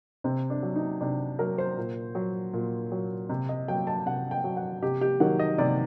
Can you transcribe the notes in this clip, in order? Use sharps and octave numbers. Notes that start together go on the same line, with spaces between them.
C3 C4
D4
F#3
D#4
C3 D4
F#3 A#4
C5
A#2
F#3
A#2
F#3
C3
D#5
F#3 G5
A5
C3 F#5
G5
F#3
F#5
C3 G4
G4
D#3 F#3 F#5
D#5
C3 D5